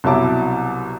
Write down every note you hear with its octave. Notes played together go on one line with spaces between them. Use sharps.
C2 B2 F#3 E4 A5 D6